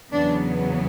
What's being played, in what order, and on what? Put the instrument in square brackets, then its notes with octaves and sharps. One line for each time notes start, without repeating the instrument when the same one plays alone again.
[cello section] E2 C#3 F#3 B3 D4